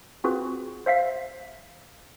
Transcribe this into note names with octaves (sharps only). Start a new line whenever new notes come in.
C4 F4 F#4 G#4 B4
C5 E5 F5 B6